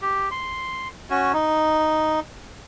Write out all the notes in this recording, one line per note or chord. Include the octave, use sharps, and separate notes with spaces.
G4
C6
C#4 F#4
D#4